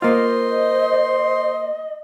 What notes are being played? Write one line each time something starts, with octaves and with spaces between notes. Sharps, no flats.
A#3 F4 C5 D#5 C6